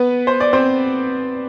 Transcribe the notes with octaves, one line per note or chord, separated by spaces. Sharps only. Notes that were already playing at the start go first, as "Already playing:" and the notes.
Already playing: B3 B4
C5
D5
C4 C5